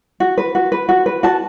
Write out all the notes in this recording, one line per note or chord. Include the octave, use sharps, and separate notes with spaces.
F#4
B4
F#4
B4
F#4
B4
F#4 A5